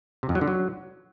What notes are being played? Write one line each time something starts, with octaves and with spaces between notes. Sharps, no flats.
C3
F2
F#3
D3
F#3